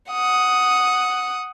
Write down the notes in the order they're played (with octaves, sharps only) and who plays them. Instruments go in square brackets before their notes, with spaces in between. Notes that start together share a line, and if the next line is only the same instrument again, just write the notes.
[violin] F#5 D#6